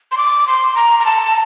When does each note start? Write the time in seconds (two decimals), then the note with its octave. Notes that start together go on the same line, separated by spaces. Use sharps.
0.12 C6
0.17 D6
0.47 C6
0.75 A#5
1.00 A#5
1.06 A5